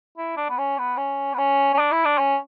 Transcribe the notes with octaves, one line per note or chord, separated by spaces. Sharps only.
E4
D4
B3
C#4
B3
C#4
B3
C#4
C#4
D4
E4
D4
C#4